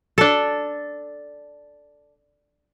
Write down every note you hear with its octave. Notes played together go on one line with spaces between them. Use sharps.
D4 A4